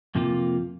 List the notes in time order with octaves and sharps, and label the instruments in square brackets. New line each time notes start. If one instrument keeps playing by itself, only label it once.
[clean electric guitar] F2 C3 F3 A#3 F4